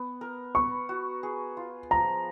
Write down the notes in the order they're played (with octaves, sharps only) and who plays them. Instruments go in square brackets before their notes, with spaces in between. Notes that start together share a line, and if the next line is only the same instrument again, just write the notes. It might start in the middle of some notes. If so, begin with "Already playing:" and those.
Already playing: [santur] B3
A#4
[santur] B3 [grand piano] C#6
[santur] F#4
G#4
F4
[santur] F3 [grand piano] A#5